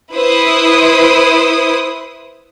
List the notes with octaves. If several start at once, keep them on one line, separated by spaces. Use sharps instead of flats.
E4 B4 C5 D#6